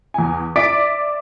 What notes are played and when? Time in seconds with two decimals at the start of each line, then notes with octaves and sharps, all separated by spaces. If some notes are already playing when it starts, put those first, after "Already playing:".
0.14 E2 G#5
0.56 D5 E5 D6 A6 B6 D7